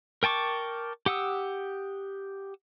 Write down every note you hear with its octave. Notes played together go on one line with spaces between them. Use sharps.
A#4 G5 A5 C#6 D6
G4 F#5 D#6 E6